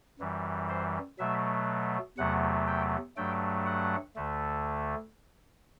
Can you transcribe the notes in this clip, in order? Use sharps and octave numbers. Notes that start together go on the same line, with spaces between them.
F#2 E3 G3
C5
B2 F#3 A3 E5
E2 C3 F#3 A3 F#5
G5
G2 F#3 A3 G5
F#5
D2 D3 A3